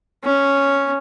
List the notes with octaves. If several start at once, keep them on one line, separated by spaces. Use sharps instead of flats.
C#4